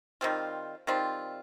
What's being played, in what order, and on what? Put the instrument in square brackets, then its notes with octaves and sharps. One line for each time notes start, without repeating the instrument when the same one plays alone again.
[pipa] D#3 G3 C4 F4
D#3 G3 C4 F4